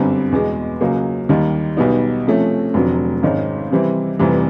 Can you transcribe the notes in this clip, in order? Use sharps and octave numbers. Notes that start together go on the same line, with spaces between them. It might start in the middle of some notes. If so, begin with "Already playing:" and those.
Already playing: G1 F#2 D3 G3 C4
E2 B2 G#3
C#2 C#3 F#3 A#3
D#2 D#3 G3
B1 B2 G3 B3 D#4
C3 F3 A3 C#4
F1 F2 D3 F#3
G#1 G#2 D#3 G#3 C#4
C3 E3 G3 C4 E4
F1 F2 C3 E3 G3